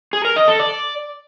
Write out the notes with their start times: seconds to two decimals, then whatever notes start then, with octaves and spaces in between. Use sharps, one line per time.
0.13 G#4
0.25 A#4
0.36 D#5
0.48 A4
0.59 D5